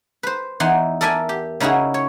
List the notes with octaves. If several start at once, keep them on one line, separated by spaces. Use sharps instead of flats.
B4 C5
E2 E3 D#4 F#5 C6
A4 A#4 D5 E5 G#5
G4
C#3 D#4 E4 F#4 G#4
C#5